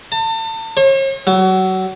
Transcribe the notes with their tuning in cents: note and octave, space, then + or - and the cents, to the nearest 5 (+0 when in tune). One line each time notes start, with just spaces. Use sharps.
A5 +35
C#5 -45
F#3 +25